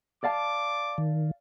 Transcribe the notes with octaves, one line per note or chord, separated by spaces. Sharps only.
D5 F5 A5 D6
D#3